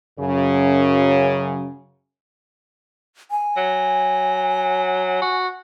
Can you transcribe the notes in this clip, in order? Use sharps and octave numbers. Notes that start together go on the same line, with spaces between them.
F#2 C#3
G#5
F#3
F#4